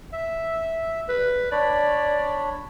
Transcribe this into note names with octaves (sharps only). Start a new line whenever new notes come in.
E5
B4
D4 C#5 D5 B5